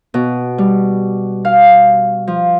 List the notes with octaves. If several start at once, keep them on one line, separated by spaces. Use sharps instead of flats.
B2
G3
F5
F3